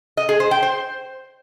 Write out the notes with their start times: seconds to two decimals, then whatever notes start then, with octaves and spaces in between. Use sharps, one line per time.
0.17 D#5
0.29 G#4
0.40 C5
0.51 G5
0.63 C5